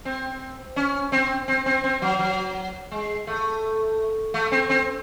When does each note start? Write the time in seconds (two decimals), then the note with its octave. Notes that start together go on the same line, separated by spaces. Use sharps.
0.05 C4
0.76 C#4
1.12 C4
1.48 C4
1.66 C4
1.84 C4
2.02 F#3
2.19 F#3
2.91 G#3
3.27 A3
4.34 A3
4.52 C4
4.70 C4